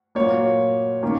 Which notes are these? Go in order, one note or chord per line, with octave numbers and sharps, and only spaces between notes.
A#2 F#3 A#3 C#5
D#3 A#3 C#4